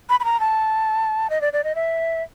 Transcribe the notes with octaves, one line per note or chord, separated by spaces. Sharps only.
B5
B5
A#5
A5
D#5
D5
D5
D#5
E5